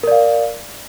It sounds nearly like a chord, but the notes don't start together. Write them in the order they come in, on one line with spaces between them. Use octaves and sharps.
A#4 D5 F5